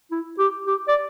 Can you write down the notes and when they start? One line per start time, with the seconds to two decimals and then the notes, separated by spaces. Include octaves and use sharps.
0.11 E4
0.39 G4
0.67 G4
0.88 D5